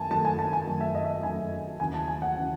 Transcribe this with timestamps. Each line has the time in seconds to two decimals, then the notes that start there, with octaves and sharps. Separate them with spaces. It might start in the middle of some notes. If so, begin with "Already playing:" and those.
Already playing: F#2 D#3 A3 G#5 A5
0.11 F#2 D#3 A3 A5
0.25 G#5
0.39 A5
0.53 G#5
0.67 F#2 D#3 A3
0.81 E5
0.95 D#5
1.04 E5
1.10 D#5
1.23 F#2 D#3 A3 G#5
1.79 D#2 C#3 E3 G#5
1.94 A5
2.08 G#5
2.22 F#5
2.38 C#3 E3